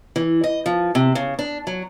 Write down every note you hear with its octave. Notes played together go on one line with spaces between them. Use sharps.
E3
D#5
F3
C3
C#3
D4
F#3